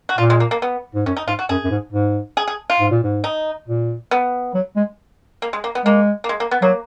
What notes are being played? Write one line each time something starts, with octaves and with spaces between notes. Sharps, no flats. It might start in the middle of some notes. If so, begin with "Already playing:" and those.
F#4
A#2 F4
G#3
A#3
A#3
B3
G#2
F#2 C#4
D#4
G#2 F4
F#4
F#2 G#4
F#2
G#2
G#2
G#4
G#4
F4
G#2
A#2
G#2
D#4
A#2
B3
F#3
G#3
A#3
G#3
A#3
B3
G#3 A#3
A#3
G#3
A#3
B3
F#3 A#3